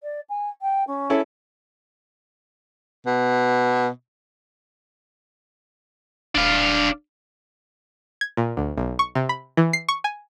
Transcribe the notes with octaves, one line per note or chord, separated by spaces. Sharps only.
D5
G#5
G5
C#4
C#4 E4 A4
B2
D#1 D4 F5
G#6
A#2
D2
B1
C#6
C3
B5
E3
C7
C#6
G#5